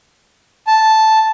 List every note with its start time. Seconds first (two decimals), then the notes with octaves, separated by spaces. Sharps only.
0.67 A5